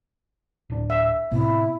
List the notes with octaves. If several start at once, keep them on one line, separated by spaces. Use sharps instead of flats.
D1 D4
E5
A2 C3 B3 E4